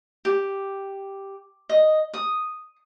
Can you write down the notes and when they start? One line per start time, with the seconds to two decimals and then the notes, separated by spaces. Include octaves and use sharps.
0.25 G4
1.69 D#5
2.14 D#6